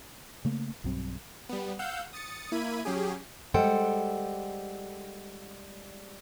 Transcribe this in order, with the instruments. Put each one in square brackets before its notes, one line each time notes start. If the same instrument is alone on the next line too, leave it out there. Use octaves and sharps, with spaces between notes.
[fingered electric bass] C#3 A3 A#3
B1 G2 F#3 C4
[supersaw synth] G3 B3
F5 F#5 E6 G6
D#6 A6 C#7
A#3 E4 B5 G#6 D#7
F#3 C#4 G4 G#4
[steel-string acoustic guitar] G3 G#3 A4 C5 F#5 G5